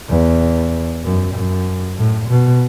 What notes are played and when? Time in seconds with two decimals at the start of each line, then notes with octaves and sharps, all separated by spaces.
0.10 E2
1.03 F#2
1.34 F#2
1.97 A2
2.28 B2